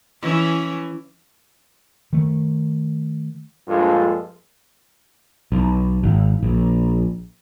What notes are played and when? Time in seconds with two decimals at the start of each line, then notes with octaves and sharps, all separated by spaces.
0.22 E3 C#4
2.13 D#3 A3
3.68 A#1 G2 F3 G#3 F4 A4
5.52 B1
6.03 G#1
6.43 A#1